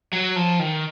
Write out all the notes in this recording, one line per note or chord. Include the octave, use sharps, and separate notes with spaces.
F#3
F3
D#3